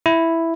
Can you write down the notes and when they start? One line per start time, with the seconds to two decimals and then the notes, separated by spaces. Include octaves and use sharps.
0.06 E4